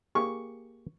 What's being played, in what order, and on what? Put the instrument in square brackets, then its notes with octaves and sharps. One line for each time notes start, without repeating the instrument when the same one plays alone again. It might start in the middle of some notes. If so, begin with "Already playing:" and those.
[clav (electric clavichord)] A#3 G4 G#4 [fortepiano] C#6